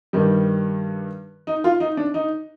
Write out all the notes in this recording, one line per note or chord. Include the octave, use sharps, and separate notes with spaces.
G2 D#3 G3
D#4
F4
D#4
D4
D#4